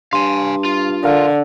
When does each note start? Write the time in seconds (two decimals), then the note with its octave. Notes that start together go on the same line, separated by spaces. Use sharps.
0.13 G2 F5 G#5 C6
0.65 F4
1.04 D3 A#4 F5